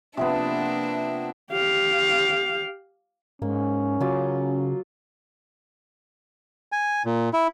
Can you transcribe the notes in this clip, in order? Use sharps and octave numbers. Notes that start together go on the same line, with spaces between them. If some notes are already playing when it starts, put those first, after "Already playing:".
C3 F3 A#3 B3 D4 E5
G4 F5
G#2 A#3 C#4
C#3 F#3 F4 D6
G#5
A#2
E4